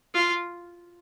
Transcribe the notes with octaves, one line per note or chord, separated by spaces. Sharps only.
F4